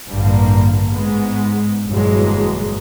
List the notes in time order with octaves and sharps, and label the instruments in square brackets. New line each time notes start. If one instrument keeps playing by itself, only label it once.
[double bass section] A1 G2 D3 A#3
G#2 G#3 B3
G1 F2 A#2 E3 F#3 G#3